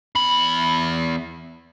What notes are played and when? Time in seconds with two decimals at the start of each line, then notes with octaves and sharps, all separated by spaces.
0.15 E2 B5